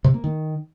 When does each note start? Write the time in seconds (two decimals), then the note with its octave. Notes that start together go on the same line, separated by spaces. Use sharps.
0.04 C3
0.14 A#3
0.24 D#3